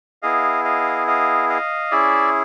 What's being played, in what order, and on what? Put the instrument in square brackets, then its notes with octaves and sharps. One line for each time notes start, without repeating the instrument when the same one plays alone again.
[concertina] B3 E4 G#4 D#5 F5
D#5 F5
D#5 F5
D#5 F5
C#4 E4 G#4 D5 E5